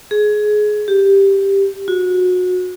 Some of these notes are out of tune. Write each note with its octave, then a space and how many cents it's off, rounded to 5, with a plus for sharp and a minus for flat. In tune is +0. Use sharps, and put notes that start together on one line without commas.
G#4 +20
G4 +5
F#4 -25